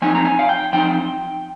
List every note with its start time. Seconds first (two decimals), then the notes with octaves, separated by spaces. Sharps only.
0.02 F3 C4 D#4 G#5
0.15 A#5
0.25 G#5
0.39 F5
0.49 G5
0.73 F3 C4 D#4 G5